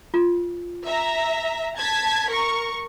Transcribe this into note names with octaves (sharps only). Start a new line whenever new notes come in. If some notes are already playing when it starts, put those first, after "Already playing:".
F4
E5 A#5
A5 G#6 B6
A#4 C#6